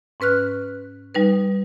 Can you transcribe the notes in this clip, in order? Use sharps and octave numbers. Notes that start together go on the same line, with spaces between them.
G#2 C#4 B4 F6 F#6
G3 D#4 B4